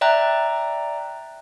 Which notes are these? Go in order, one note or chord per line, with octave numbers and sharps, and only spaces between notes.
D5 E5 G5 A#5 F#6